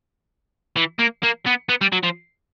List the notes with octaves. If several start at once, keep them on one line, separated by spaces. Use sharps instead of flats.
E3
A#3
A#3
B3
B3
G3
F#3
F3